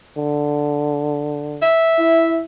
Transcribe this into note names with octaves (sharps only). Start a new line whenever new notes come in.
D3
E5
E4